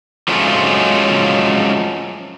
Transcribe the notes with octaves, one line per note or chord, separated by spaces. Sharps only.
F3 F#3 G#3 A3 C#4 F4